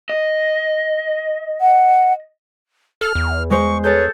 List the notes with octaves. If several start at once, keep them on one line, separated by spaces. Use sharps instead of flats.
D#5
F#5
A4 F6
E2
G#3 C5 C#6
G#4 A4 B4 C#5 G6 A6